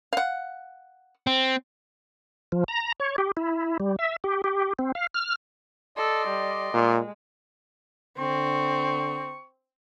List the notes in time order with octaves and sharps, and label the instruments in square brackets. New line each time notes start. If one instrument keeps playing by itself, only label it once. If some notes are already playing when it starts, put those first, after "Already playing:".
[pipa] F5 F#5
[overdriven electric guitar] C4
[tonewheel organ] F3
A#5
C#5
G4
E4
G3
E5
G4
G4
C4
F5
F6
[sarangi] A4 [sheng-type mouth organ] D5 D#5 C6
[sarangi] G3
[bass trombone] A#2 [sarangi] G#3
[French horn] D3 [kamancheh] C4 [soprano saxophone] C#6